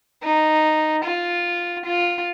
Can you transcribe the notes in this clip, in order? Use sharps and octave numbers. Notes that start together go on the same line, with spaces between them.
D#4
F4
F4